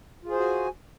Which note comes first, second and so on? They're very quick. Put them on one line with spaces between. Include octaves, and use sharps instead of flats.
F4 G#4 C5 F#4 G#5